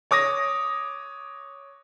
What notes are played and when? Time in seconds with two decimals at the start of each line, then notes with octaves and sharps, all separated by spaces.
0.11 C#5 D6 D#6 A#6